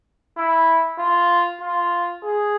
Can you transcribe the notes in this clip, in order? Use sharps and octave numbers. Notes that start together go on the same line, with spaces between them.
E4
F4
F4
G#4